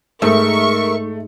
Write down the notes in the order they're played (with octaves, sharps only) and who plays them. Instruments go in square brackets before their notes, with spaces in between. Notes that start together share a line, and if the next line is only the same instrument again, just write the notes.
[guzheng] G#2 [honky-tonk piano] A3 [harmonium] A#4 E5 [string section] C#6